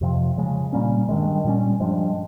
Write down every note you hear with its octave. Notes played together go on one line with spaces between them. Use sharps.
F2 C3 F3
C#3 F3 G#3
A#2 G3 A#3 C#4
G2 D#3 G#3
A#2 G3 C#4
G2 F3 G#3